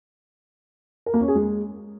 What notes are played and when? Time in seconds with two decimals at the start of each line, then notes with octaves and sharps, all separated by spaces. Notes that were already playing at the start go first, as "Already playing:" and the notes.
1.06 A#4
1.14 A#3
1.21 C#4
1.28 G#4
1.35 G#3